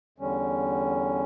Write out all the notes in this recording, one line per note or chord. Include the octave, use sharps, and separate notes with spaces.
E2 D3 G3 C#4